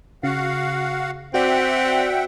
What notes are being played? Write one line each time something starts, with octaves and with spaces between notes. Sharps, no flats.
C#3 F#4 F5 F#5
C4 F#4 D5 E5 F#5 G5